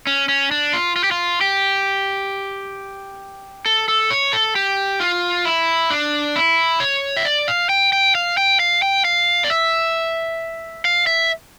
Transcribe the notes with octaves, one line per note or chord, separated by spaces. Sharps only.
C#4
C#4
D4
F4
F4
G4
F4
G4
A4
A4
C#5
A4
G4
F4
E4
D4
E4
C#5
E5
D5
F5
G5
G5
F5
G5
F5
G5
F5
D5
E5
F5
E5